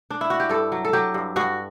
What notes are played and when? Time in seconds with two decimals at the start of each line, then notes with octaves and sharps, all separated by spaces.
0.11 D4
0.21 E4
0.30 F#4
0.40 G4
0.49 G2 A4
0.72 F#3
0.85 A4
0.93 F#3 G4
1.14 G2
1.36 G2 F#4